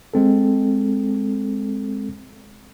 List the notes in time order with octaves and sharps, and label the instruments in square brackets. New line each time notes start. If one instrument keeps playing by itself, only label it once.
[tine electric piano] G#3 C4 A4